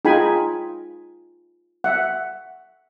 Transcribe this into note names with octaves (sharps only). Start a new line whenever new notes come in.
D#4 F4 G#4 G5 G#5 B5
E5 F#5